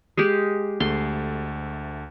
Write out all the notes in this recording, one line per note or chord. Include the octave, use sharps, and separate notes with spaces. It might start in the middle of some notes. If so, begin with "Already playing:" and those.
G#3 G4
D2 A3 C6